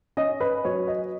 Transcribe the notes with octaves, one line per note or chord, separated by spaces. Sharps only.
C#4 D#5
B4
F#3 C#5
D#5